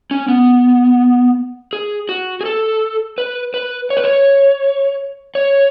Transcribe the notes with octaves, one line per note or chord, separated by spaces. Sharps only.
C#4
B3
G#4
F#4
G#4
A4
B4
B4
C#5
B4
C#5
C#5